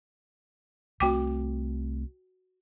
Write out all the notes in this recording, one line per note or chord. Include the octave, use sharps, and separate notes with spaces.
C2 A3 C4 F#4 G5 D6